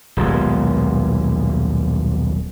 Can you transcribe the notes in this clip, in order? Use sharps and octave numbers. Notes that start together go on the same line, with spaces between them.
D#1 B1 G#3